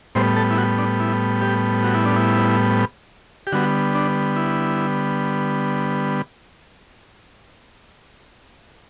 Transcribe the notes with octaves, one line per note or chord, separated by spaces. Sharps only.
A2 G3 B3 C5
A4
E4
F#4
D4
E4
G4
F#4
E4
D4
E4
G4
D3 G3 B3 F#4
D4
E4